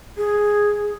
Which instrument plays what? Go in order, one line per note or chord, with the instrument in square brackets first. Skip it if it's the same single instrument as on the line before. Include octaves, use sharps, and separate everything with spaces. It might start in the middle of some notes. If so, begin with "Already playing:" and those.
[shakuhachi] G#4